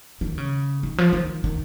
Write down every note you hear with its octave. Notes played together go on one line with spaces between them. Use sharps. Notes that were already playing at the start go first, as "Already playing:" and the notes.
D#3
C#3
D#3
F3
D#3
D#3